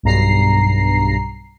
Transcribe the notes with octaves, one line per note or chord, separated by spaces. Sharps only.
B1 G2 A#5 C7